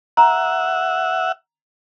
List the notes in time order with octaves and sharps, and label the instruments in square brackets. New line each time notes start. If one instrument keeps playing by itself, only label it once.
[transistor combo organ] E5 F#5 [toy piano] A#5